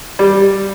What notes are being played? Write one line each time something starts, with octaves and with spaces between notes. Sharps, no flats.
G3